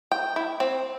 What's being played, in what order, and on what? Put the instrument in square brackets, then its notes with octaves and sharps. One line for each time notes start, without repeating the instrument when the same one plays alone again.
[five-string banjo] G5
E4
C4